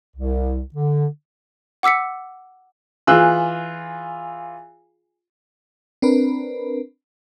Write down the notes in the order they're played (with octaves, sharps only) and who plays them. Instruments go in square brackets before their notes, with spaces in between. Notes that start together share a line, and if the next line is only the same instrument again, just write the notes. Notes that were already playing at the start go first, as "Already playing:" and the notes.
[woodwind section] C2
D3
[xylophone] F#5 D6 E6 B6 C#7
[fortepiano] E3 F4 G#4 E6 F#6
[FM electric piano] C4 D4 A#4 B4